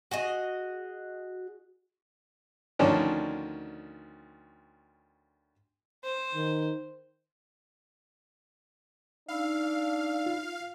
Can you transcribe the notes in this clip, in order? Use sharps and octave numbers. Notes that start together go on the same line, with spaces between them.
F#4 G#4 D#5
D2 D#3 F3 C#4 D4
C5
D#3
D4 D#4 D5 F5 B5 E6
F4